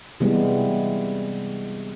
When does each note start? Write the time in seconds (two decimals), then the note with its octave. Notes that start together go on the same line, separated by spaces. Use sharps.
0.20 C3 E3 G3 G#3 B3